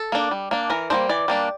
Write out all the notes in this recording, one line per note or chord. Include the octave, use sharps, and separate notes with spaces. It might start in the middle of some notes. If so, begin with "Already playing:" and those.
Already playing: A4
A#3 D4
G3
A#3 D4
E3 A#4
G3 A#3 D4 C5
E3 D5
G3 A#3 D4